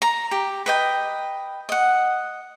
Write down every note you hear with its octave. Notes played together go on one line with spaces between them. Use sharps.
A#5
G4
B4 D#5 G5
D#5 F#5